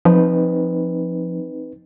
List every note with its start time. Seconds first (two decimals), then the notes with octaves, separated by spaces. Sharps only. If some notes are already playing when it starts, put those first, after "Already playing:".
0.05 F3 C4 D#4 B4